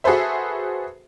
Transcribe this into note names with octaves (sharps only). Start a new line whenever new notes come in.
F#4 G#4 A4 B4 C5 E5